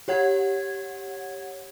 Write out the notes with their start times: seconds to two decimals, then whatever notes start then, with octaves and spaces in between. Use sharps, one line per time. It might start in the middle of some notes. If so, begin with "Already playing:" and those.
0.08 G4 C#5 F#5 G#6